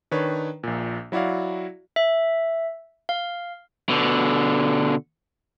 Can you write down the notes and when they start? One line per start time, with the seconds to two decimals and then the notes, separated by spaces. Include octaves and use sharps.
0.11 D#3 D4 B4 C#5
0.63 A#1 A#2
1.12 F#3 E4 F#4 D5 F5
1.96 E5
3.09 F5
3.89 B2 D3